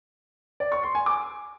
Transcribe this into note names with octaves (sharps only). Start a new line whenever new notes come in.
D5
C#6
C6
G#5
D6